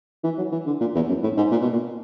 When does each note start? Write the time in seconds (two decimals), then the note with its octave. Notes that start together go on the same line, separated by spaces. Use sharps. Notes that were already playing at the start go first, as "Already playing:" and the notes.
0.24 E3
0.38 F#3
0.52 E3
0.67 D3
0.81 A#2
0.95 E2
1.09 F#2
1.23 A2
1.37 G#2
1.51 A#2
1.62 B2
1.73 A#2